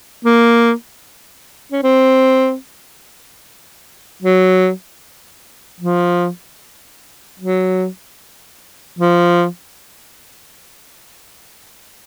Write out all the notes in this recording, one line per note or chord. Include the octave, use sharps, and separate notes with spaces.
A#3
C#4
C4
F#3
F3
F#3
F3